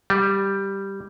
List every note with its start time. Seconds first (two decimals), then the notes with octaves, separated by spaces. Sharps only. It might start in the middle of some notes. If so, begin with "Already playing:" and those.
0.10 G3